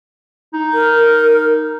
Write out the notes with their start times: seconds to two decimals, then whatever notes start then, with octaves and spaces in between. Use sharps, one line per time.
0.53 D#4
0.74 A#4